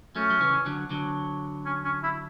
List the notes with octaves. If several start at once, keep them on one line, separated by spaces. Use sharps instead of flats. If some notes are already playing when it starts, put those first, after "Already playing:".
F#3 A3 C#4
F#3
C#3 E3
D3 F#3
D3 F#3
C#4
C#4
E4